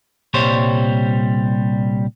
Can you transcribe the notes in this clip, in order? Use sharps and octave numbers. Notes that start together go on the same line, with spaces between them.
C2 A#2 G3 C5 C#5